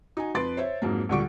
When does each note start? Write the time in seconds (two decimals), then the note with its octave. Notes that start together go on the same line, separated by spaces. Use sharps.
0.17 D#4 F#4 G#5
0.34 F2 B4 C6 A6 D7
0.57 C5 C#5 E5
0.82 F2 G#2 F#3 A#3
1.09 D2 A#2 D3 G3 C#6 D7